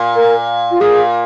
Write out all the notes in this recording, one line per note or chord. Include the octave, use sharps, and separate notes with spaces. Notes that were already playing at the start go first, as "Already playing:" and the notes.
Already playing: A#2
A#4
F4
A#2 G#4